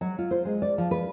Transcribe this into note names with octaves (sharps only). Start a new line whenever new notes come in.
F#3
F4
C5
G#3
D5
F3
B4